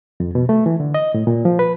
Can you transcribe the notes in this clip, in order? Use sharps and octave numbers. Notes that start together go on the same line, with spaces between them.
F2
B2
A3
E3
D3
D#5
A2
A#2
F3
B4